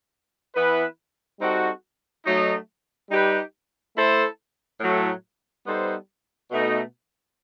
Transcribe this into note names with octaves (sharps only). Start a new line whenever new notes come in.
E3 B3 E4 B4
G3 C4 D#4 F#4 A4
F#3 A3 D#4
G3 D#4 G4 B4
A3 E4 A4 C5
A2 F#3 A3
G3 B3 D#4 A4 C5
B2 A3 D#4